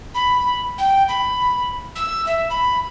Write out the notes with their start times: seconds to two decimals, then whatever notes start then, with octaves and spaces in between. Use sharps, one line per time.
0.15 B5
0.78 G5
1.09 B5
1.96 E6
2.26 E5
2.50 B5